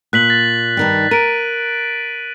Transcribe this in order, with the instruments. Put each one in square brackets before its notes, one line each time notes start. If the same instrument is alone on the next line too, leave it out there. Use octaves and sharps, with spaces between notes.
[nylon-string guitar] A#2 [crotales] F#6 B6 F#7
[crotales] A6
[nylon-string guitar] G2 D#3 G3
[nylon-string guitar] A#4 [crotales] D7 D#7